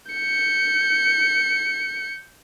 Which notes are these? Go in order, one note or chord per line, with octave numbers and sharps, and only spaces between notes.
G6 C#7